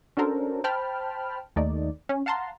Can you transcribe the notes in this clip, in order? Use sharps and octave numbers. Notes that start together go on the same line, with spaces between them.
C#4 D4 F#4 A4 A#4 C5
C5 G5 A5 B5 F6
D#2 A3 D#4 D5
C#4
F5 F#5 A5 A#5 C6